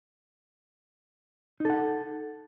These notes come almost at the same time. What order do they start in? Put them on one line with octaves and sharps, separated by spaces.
D#4 A4 F#5